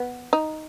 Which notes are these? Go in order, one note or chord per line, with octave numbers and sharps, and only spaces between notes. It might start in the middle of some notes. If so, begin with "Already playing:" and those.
Already playing: B3
D#4